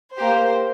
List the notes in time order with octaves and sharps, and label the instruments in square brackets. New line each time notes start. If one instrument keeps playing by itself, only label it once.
[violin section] A#3 G4 C5